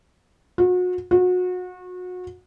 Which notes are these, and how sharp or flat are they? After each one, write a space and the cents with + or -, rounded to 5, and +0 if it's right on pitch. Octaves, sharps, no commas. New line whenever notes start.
F#4 -35
F#4 -30